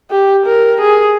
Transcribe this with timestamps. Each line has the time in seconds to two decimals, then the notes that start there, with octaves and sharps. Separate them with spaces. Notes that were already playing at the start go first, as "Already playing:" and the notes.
0.11 G4
0.46 A#4
0.81 G#4